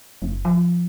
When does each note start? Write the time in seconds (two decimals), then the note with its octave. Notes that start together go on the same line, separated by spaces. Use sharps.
0.22 F#1
0.45 F3